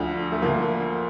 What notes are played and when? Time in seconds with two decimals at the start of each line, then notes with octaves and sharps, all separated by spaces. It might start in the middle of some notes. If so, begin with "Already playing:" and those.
Already playing: D2 D3 F3
0.32 A3
0.42 D2 D3 F3 A#3